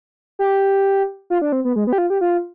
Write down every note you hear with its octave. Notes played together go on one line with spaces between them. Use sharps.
G4
F4
D4
C4
B3
G#3
B3
G4
F4
G4
F4